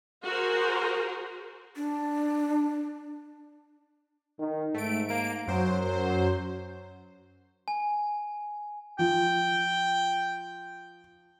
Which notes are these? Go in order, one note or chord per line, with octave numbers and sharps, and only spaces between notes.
F#4 G#4 A#4 C5
D4
D#3
G#2 A3 D7
A#3 D7
F#2 F#3 C5
G#5
F3 G5